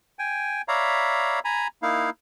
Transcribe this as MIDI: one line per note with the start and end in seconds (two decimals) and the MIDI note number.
0.19 0.62 79
0.19 0.62 80
0.68 1.40 73
0.68 1.40 74
0.68 1.40 76
0.68 1.40 77
0.68 1.40 82
0.68 1.40 83
1.45 1.67 80
1.45 1.67 82
1.45 1.67 83
1.83 2.10 58
1.83 2.10 63
1.83 2.10 64
1.83 2.10 77